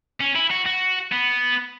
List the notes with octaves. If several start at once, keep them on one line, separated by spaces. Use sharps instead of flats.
C#4
E4
F#4
F#4
B3